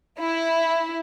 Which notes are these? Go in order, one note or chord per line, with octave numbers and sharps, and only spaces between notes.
E4